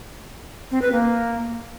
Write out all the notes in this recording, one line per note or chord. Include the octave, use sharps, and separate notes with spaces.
C4
B4
A#3